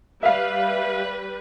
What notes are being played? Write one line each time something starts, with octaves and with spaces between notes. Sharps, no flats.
G3 B4 E5 F5